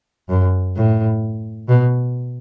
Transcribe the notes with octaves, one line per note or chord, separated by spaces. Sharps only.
F#2
A2
B2